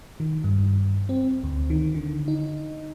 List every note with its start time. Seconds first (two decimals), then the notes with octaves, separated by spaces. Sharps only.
0.20 D#3
0.44 G2
1.09 C4
1.44 D2
1.70 D#3
1.95 D3
2.28 D#4